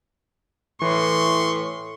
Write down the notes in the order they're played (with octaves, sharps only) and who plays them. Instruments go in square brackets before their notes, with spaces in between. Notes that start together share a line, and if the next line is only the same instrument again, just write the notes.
[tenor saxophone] A2 [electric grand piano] E3 [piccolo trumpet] C6 [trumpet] C#6